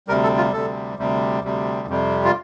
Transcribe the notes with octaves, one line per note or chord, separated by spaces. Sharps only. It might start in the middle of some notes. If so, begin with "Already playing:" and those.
D2 C3 G3 A#4
A4
F4
D2 C3 G3 A4
D2 C3 G3
D2 C3 G3
F2 C3 G3
F4